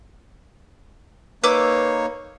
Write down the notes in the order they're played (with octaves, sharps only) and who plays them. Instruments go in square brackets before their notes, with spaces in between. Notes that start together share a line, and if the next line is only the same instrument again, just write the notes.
[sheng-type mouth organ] A#3 D#4 C#5 [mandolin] B4 D6 E6